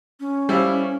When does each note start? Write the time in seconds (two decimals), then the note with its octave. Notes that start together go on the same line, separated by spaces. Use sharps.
0.20 C#4
0.49 G3 E4 A4 C5 F5